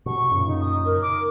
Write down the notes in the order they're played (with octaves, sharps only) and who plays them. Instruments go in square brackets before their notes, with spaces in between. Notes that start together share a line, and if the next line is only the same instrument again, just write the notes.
[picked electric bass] B2 [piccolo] C#6
[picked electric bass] F#2 A#2 C#3
[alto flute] D#4
[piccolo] D#6
[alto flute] A#4
[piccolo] D6